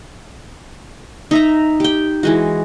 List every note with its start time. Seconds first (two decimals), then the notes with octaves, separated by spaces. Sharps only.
1.31 D#4 E5 A#5
1.80 G4 G5
2.23 E3 G#3 F#4